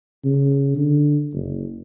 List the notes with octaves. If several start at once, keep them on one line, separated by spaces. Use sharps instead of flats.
C#3
D3
F#1